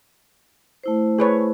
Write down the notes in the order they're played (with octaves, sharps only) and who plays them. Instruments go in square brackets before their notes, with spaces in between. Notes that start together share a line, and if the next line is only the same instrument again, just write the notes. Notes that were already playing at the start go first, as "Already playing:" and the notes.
[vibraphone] A3 E4 C5
[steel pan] G#4 B4 C#5